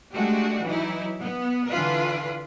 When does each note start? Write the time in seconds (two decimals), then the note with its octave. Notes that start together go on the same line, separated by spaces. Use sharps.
0.13 G#3 A3 D4 F#4 G4
0.65 E3 F#3 D#4 E4
1.21 B3
1.69 D3 E3 F4 B4